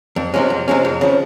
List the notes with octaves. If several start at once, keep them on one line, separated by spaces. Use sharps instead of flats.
F2
C3 F3 G#3 C#4
F2
C3 F3 G#3 C#4
F2
C#3 F3